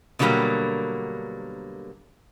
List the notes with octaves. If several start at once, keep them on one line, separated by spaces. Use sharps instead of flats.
B2 D3 F#3 G3 A#3 B3